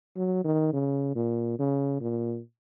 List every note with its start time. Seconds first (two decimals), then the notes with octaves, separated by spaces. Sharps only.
0.16 F#3
0.45 D#3
0.73 C#3
1.16 A#2
1.59 C#3
2.01 A#2